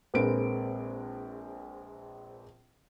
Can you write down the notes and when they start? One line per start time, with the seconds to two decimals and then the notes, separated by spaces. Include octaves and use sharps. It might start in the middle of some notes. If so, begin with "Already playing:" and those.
0.14 A#1 G#3 C4 A#4 B4 D7